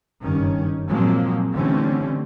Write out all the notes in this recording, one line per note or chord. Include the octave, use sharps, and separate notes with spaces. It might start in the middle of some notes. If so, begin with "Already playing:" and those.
F#1 G2 D#3 C#4
A#2 F3 F#3 G#3 A#3 C4
D3 E3 G3 A3 C4 C#4